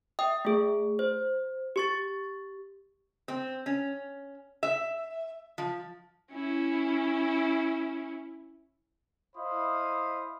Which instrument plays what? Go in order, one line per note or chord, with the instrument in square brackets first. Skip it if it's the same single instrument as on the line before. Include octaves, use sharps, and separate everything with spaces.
[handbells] E5 G5 D#6
A3 G#4
C5
G4 C#6 A6
[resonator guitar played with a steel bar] C4
C#4
E5
F3
[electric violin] C#4 E4
[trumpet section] E4 C5 D#5 F5 B5 D#6